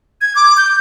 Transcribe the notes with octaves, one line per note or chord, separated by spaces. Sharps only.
G#6
D6
G6